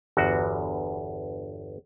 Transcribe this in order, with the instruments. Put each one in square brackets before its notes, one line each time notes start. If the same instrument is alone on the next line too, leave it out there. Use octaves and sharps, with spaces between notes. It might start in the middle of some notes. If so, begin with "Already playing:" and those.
[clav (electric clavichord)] G1 E2 F#4